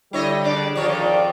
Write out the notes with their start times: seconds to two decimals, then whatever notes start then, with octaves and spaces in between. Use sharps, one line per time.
0.13 D3 G3 E4 C#5 D#5
0.43 C#3 D4 D5
0.76 G#1 F2 D#3 F3 C#5 D5